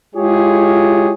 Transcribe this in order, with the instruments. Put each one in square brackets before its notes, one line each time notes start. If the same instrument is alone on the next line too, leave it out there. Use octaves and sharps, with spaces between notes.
[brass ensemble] G#3 E4 F4 G4 G#4 C#5